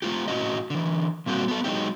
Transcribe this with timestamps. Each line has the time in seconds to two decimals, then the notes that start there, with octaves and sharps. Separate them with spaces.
0.02 A3 F4 G4
0.28 A2 C#4 F#4 D#5
0.70 D3 E3
1.26 A#2 G3 A#3 C4 F#4
1.48 B3 A4
1.64 F#3 G#3 C4 D#4 G4